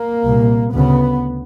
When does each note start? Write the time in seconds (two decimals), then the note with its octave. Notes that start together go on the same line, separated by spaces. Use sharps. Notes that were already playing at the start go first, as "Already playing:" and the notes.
Already playing: A#3
0.24 C2 A#2
0.73 D2 C#3 B3